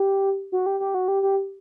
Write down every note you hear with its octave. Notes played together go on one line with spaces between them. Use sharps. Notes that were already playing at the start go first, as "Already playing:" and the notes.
Already playing: G4
F#4
G4
G4
F#4
G4
G4